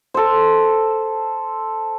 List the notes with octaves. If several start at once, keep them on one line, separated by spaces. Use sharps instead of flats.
A4 C5